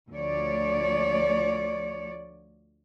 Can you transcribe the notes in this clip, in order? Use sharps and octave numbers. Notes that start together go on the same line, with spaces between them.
D2 F3 C#5 D5